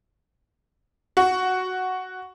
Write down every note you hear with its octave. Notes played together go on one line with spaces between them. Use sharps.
F#4